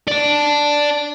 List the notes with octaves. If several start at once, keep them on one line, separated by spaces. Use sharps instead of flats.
D5 A5